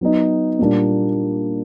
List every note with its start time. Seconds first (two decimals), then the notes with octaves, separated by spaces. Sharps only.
0.01 F#3 B3 D#4
0.59 A#2 G3 A#3 D4